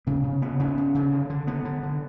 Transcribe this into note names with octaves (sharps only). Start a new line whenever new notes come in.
C#3 B3
C#3
C#3 B3
C#3 B3
C#3
C#3
D3
D3
D3 B3
D3
D3